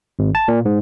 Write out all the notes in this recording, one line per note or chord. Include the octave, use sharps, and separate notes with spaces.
G#1
A5
A#2
G#2